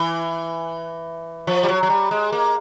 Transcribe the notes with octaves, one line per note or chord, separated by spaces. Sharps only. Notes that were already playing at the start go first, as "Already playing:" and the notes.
Already playing: E3
F3
G3
F#3
F#3
G3
G#3
A#3